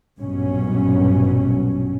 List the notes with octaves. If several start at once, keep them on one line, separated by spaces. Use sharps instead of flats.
A#1 G2 B2 F#3 C#4